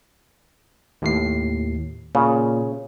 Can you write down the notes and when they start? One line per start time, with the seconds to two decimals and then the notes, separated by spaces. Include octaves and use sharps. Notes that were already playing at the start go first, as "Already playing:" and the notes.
1.02 D#2 A2 C7
2.15 A#2 C#3